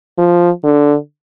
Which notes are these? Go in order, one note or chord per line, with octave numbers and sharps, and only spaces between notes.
F3
D3